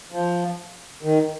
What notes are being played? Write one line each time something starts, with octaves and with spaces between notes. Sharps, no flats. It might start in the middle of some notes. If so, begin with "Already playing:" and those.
F3
D#3